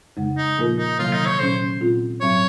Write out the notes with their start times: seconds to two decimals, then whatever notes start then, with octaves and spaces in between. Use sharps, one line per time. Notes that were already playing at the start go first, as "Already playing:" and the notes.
0.17 F2 C#3 G#3
0.37 D#4
0.57 A#2 F3 A#3 F4 A#4
0.78 D#4
0.99 C3 D#3 F#3 A#3 F4
1.13 D#4
1.26 C#5
1.39 A#2 F#3 C#4 C5
1.80 A#2 G#3 C4 F4
2.21 G#2 F#3 C4 C#5